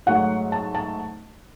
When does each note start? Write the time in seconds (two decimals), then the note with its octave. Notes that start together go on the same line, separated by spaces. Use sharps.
0.06 G#2 F#3 A3 F#5
0.52 A5
0.75 A5